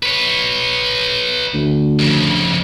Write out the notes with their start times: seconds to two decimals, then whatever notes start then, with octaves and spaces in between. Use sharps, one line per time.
0.03 B4 C#5
1.54 D2
1.99 F2 C#3